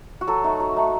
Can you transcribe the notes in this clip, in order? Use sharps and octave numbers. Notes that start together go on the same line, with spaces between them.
F#4
F#3 A4
A3 D#4
F#3
A3 D#4